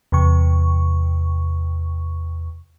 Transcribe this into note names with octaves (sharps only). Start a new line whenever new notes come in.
E2 C3 C#6